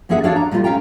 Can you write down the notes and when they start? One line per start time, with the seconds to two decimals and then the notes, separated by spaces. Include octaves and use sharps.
0.09 F#2 A#3 C#4 G#4 E5 F#5
0.23 E2 D4 F#4 C#5 D5 F5
0.36 A#5
0.51 A#2 G3 A3 D4 F4
0.64 C#4 F5 G5 A#5